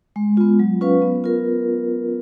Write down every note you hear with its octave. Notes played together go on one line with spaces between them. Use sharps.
G#3
B3 F4
F#3
C#4 F4 B4 F5
B3
F4 A#4